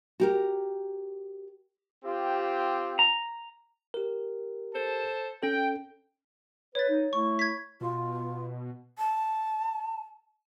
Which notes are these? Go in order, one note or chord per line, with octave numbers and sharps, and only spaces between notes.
F#4 G4 A#4
C4 F4 G4
A#5
G4 A#4
A4 C5 A5
C#4 A4 G5
B4 C#5 A6
D#4
A3 E4 C#6
G#6 B6
B2 F4
A5